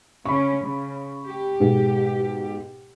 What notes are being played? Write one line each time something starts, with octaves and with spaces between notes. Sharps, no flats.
C#3 C#4 B5 C#6
C#3
G4
G#2 B2 G#4